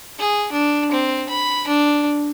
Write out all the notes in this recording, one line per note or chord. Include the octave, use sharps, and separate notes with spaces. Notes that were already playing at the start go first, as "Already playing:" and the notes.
G#4
D4
C4
B5
D4